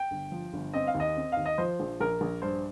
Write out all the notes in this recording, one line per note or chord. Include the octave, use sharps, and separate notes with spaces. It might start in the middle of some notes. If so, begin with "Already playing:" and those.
Already playing: G5
G1
F3
G1
C4 D#5
F5
D#2
D#5
C4
D#2 F5
D#5
F3 C5
A#1
A#1 A#4
A#1
G2 C5